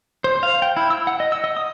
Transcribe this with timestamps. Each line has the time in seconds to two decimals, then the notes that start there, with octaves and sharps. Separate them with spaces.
0.24 C5
0.43 F5
0.62 G5
0.77 E4
0.90 E6
1.07 F#5
1.20 D#5
1.32 E6
1.44 D#5
1.57 D#6